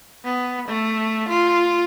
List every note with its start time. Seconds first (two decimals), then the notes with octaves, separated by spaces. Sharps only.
0.25 B3
0.69 A3
1.29 F4